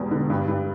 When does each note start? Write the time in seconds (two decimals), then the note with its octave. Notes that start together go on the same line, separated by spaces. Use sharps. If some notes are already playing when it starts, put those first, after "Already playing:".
Already playing: E1 E2 G3
0.11 D3
0.30 G2
0.48 G2